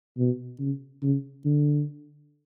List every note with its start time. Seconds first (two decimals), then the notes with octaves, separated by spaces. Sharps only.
0.18 B2
0.60 C#3
1.03 C#3
1.45 D3